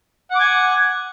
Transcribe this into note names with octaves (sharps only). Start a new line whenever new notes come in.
F#5 G#5 D6